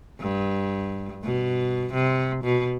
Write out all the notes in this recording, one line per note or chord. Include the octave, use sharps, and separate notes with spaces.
G2
B2
C3
B2